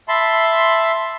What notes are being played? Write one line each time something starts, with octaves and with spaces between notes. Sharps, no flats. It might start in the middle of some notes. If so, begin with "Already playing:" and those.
E5 A5 B5 C6